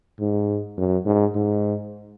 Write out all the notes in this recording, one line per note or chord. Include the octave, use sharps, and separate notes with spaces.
G#2
F#2
G#2
G#2